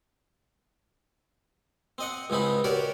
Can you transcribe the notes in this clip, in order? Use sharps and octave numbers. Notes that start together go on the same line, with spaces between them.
C4 D#5 F#5
C#2 G#2 C4 D#4 B5
F#4 G4 A#4 C#5 D5